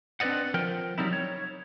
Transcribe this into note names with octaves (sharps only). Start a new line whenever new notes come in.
C4 D4 B4 D5 D#5 F#5
F3 A#4 G5
F#3 G3 C4 D#4 E4
C#5